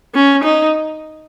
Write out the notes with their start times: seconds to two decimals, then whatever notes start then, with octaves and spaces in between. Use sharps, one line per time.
0.14 C#4
0.44 D#4